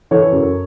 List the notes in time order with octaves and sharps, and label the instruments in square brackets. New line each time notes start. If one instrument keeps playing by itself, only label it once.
[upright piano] E3 A4 C#5
F#2